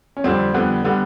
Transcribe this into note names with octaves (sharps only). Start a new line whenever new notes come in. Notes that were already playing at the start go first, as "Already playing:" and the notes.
C#4
F2 D3 G3 C4
F2 D3 G3 B3
D3 G3 B3